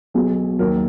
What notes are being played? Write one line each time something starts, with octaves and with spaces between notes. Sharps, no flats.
B1 B2 F#3 G#4
D#2 D#3 F#3 A#4